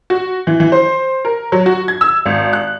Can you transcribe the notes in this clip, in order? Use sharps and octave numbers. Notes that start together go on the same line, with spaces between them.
F#4
E3
E3
C5
A#4
F#3
F#4
G#6
E6
G#1
F#6